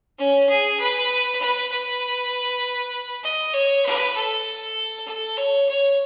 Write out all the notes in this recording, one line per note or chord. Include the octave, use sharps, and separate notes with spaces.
C#4
G#4
B4
B4
B4
D#5
C#5
B4
A4
A4
C#5
C#5